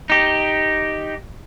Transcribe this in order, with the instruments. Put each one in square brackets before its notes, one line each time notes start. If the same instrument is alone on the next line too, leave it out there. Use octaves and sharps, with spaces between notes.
[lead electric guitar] D#4 G4